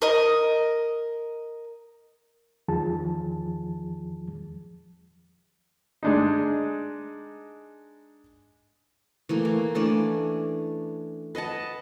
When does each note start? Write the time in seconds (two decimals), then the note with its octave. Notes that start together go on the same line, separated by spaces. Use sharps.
0.02 A#4 D#5
2.68 E2 D#3 F3 G#4 A5
6.03 G#3 D4 D#4
9.29 E3 A3 A#3
9.45 A#3
9.75 E3 A3 C#4 D4
11.35 B4 D#5 F#5 A5